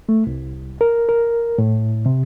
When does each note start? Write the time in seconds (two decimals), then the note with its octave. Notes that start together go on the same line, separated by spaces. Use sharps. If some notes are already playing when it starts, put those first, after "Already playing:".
0.09 A3
0.27 C2
0.81 A#4
1.09 A#4
1.58 A2
2.06 C3